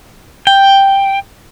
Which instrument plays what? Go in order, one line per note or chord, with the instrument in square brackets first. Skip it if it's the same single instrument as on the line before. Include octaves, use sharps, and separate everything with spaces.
[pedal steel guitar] G5